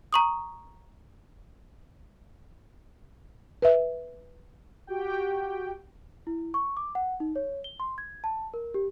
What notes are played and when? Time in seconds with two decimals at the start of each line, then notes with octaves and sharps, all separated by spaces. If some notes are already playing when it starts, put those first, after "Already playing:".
0.13 A#5 C#6 D#6
3.62 B4 E5
4.87 F#4 G4 G5
6.27 E4
6.54 C#6
6.77 D6
6.95 F#5
7.20 D#4
7.36 C#5
7.64 G7
7.80 C6
7.98 G#6
8.24 A5
8.54 A#4
8.74 G4